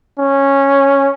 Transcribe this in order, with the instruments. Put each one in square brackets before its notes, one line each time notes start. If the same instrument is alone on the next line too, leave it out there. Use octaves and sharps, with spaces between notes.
[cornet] C#4